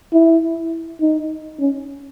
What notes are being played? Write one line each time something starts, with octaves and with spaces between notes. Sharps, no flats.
E4
D#4
C#4